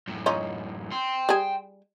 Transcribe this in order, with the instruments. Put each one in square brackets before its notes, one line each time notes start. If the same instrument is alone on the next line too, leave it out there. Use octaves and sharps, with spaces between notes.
[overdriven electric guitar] F#2 A2
[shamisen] C#4 D#4 F4
[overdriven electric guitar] G5 C6
[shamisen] G3 G#4